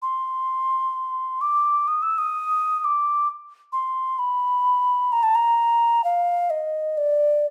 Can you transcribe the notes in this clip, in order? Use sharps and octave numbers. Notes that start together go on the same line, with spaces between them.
C6
D6
D#6
E6
D#6
D#6
D6
C6
B5
A#5
A5
A#5
F5
D#5
D5